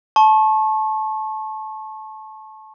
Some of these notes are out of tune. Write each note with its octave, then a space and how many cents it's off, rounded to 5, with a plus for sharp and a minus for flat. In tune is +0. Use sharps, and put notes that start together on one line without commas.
A5 -20 C#6 -30